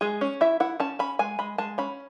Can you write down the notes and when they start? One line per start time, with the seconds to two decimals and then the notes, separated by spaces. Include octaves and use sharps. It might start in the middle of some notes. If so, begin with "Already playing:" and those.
0.01 G#3 G#4
0.21 C#4
0.41 E4 E5
0.60 E4 F#5
0.80 C#4 A5
0.99 C#4 B5
1.19 G#3 G#5
1.39 G#3 B5
1.58 G#3 A5
1.78 C#4 B5